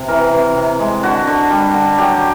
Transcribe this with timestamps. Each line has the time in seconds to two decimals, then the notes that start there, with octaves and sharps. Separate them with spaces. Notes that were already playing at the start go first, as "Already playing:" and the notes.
Already playing: C3
0.08 E3 A#4
0.32 C3
0.56 C3
0.79 G#3
1.03 D3 F#4
1.27 D3
1.50 G3
1.74 D3
1.98 F#3 G4